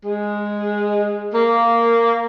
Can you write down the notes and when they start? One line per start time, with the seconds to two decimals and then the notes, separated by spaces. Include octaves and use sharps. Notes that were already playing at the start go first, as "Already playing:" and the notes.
0.05 G#3
1.34 A#3